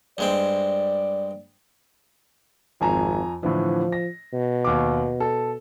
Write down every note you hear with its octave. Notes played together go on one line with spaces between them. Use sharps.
G2 G#3 C4 D5
G#1 F2 G#5 A#5
A2 D3 E3 F3
A#6
B2
D#2 D6
A4